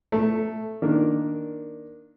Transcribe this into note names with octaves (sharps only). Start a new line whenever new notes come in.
A3
D#3 A#3 D4 A#4